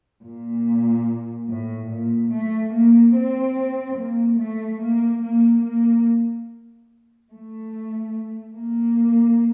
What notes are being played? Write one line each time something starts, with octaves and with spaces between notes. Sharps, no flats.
A#2
A2
A#2
A3
A#3
C4
A#3
A3
A#3
A#3
A#3
A3
A#3